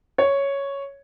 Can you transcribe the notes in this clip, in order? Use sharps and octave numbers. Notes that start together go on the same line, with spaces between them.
C#5